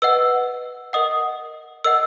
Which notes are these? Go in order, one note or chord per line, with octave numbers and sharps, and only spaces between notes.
B4 D#5 F#5 E6
A#4 D#5 F#5 D#6
A#4 D#5 F#5 E6